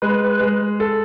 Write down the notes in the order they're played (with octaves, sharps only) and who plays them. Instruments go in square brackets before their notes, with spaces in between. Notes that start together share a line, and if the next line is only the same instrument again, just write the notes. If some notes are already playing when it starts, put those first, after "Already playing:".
[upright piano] G#3 [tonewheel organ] B4
[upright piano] G#3
A4